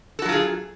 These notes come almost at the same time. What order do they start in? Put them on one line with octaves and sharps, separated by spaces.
A4 F#4 F#3 F4 G#4